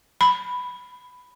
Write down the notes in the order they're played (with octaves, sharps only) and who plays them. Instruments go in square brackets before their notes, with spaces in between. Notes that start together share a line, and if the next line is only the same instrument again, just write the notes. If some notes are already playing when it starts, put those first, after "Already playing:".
[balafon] B5